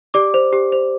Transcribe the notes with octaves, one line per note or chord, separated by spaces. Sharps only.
G4 D5 D6
C5
G4
C5